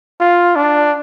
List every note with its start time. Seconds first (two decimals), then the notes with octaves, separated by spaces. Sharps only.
0.20 F4
0.56 D4